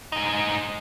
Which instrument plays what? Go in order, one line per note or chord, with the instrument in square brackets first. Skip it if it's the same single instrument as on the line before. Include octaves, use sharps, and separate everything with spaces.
[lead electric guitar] G#2 D#4